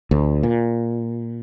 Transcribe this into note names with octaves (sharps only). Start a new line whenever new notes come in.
D2
A#2